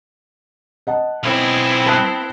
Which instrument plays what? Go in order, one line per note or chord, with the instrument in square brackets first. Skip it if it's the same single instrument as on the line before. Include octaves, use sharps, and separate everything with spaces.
[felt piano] D#5 F#5 A5
[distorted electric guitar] B1 G#4 [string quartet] B3 C4 E4
[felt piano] A5 D#6 F#6